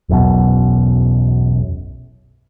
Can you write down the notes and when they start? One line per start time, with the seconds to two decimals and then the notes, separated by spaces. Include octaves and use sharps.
0.09 E1 B1 F#2 B2